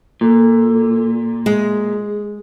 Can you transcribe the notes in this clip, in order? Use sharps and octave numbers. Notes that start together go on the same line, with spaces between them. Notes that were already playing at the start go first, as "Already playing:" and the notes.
A#2 A4
G#3 G#4